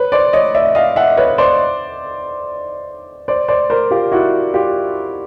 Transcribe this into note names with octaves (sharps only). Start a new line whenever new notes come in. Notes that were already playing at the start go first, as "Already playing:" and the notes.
Already playing: B4 C#5
C5 D5
C#5 D#5
D5 E5
D#5 F5
E5 F#5
B4 C#5
C5 D5
C5 D5
C5 D5
A#4 C5
F4 G4
E4 F#4
F4 G4